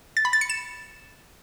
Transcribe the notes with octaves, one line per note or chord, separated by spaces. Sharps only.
A6
B5
A6
C#7
E7